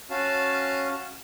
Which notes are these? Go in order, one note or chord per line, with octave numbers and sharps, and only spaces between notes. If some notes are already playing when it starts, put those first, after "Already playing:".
C#4 F#4 F5 A5